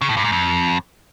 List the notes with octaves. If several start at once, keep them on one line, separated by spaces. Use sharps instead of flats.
C#3
A2
G2
G#2
F2